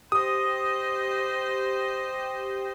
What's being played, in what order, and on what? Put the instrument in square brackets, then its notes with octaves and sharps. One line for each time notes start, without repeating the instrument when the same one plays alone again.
[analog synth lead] G4 [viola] C5 D#5 [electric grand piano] D#6